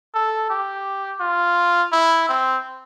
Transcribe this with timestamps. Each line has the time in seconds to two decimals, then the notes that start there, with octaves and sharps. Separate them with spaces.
0.14 A4
0.50 G4
1.21 F4
1.92 E4
2.29 C4